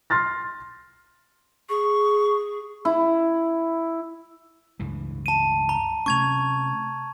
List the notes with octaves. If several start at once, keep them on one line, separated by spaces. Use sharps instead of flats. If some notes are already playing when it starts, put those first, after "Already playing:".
C6 F6 A6 A#6
G#4 C#6
E4
C#2 G2 E3
A5 D#7
A#5
C3 A3 C#4 C#6 G#6 F7